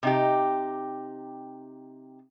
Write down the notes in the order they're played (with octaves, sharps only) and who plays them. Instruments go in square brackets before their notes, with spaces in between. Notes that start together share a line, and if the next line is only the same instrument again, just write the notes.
[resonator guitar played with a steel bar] C3 D#4 G4